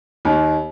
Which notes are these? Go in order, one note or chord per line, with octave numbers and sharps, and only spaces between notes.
D#2